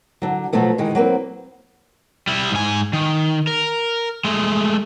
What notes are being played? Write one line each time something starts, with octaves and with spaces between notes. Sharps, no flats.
D3 F#3
B2 F3 F#3 A3 B3
D#3 E3 G#3 G#4
F#3 A#3 C4 B4
G3 E4
G#2 G#5
D#3
A#4
G#3 A3